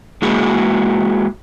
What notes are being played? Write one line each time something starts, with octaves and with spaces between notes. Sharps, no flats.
G#3 A#3 E4 F#4 G#4